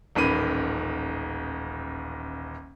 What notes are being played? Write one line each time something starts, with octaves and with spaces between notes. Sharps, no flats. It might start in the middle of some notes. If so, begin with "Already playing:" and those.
D#1 A1 D#3 B5 D#7